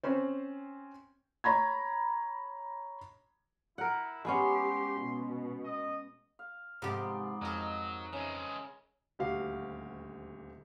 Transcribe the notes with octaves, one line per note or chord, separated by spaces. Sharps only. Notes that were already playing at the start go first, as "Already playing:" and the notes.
C4 C#4 C5
C#5 A#5 B5 G#6
E4 A#4 F#5
G#3 B3 C#4 G4 C6
B2
D#5
F5
G#2 C3 F3 B3 G4 D5 C6
F2 F3 F#3 C4 D#4 A#4 D#5
C#3 E3 G#3 E5
D#1 D2 F#4 G4 F5